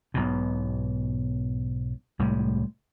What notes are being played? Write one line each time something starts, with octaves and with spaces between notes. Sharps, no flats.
B1 G#2 B2
C2 A2 G3 G#3